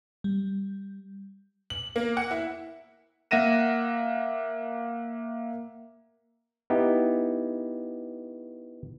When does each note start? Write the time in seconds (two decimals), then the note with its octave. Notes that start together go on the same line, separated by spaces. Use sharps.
0.24 G3
1.70 F#7
1.96 A#3
2.17 F#5
2.31 E4
3.31 A#3 E5 F#5 A#6 D#7 E7
6.70 B3 D#4 E4 G4